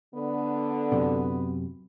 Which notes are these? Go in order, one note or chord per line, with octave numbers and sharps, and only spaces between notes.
D3 B3
F#2 C3